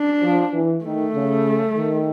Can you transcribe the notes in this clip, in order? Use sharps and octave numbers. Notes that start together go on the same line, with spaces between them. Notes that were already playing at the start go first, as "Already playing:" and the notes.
Already playing: D4
F3
E3
D#3 A3
C#3
D#3